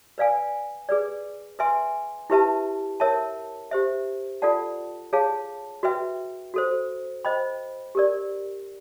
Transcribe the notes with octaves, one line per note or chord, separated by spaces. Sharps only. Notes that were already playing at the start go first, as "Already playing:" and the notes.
B4 D5 F5 G#5
G#4 B4 D5
B4 E5 G#5 C6
E4 G4 B4 E5 A5
A#4 C#5 E5 A5
G4 C5 E5
F4 A4 D5 F#5 A5
G#4 C#5 F5 A5
F#4 B4 E5 G5
F#4 A4 C5
C5 D#5 G5 B5
G4 A#4 D5